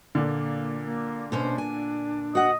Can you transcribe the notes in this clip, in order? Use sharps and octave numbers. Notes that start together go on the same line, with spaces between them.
A#2 D3 A#3
A#3
B2 C#4 D4 C5
G#5
F#4 D#5 F#5